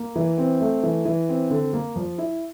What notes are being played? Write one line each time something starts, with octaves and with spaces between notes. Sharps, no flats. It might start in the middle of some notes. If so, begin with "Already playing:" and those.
Already playing: A#3
E3
C4
A3
E3
E3
C4
D3
A#3
F3
E4